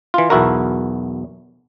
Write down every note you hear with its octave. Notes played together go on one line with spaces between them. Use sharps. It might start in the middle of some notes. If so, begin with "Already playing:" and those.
E3 F4
B1 E2 E4 F#4 A#4